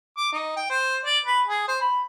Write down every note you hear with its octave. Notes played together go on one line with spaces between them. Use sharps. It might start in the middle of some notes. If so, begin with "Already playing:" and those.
D6
D#4
G5
C5
D5
B4
G#4
C5
B5